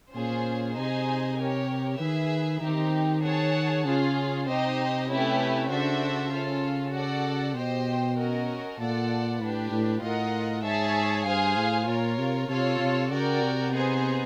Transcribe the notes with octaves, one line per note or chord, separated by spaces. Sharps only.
A#2 C#4 F4 G#4 C5
C3 D#4 G#4 C5 D#5 G#5
G4 A#4 C#5
D#3 G#4 B4 E5
D#3 C4 D#4 G4
G#4 C#5 F#5 A5
C#3 C#4 F4 G#4
C3 D#4 G4 C5 D#5
A3 C#4 E4 G4 B4
C#3 D4 F#4 A4 C5 E5
C#4 F4 A4
F#4 A4 D5 F#5
B2 G4 C5 D#5 G5
C#4 F#4 A#4 D#5
A#2 F4 A4 D5 F#5 A5
A2 D4 G4 B4
A2
A2 F4 A#4 D#5 F#5
G#2 G#4 C#5 E5 A5
G2 G#4 C5 F5 G#5
A2
A#2 F4 A#4 C#5
C3
C3 F4 A4 C#5
C3
C#3 F#4 A#4 D5 G5
C3
B3 D#4 G#4 C5